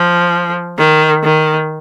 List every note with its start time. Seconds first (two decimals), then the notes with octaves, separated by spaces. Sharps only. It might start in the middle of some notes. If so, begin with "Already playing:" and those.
Already playing: F3
0.78 D#3
1.23 D#3